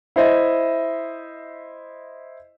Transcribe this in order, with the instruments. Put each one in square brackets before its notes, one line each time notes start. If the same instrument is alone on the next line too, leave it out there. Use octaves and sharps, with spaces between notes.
[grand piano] E4 C5 D#5 E5